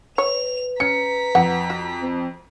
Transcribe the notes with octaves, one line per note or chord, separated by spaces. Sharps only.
B4 C#5 F7
C#4 A#5 B6 C#7
F2 F#5
F#4
C4